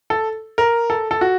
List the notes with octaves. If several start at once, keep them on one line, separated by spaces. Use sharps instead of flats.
A4
A#4
A4
A4
F#4